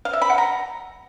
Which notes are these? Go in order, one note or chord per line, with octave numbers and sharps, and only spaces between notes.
F5
E5
B5
F#5
A#5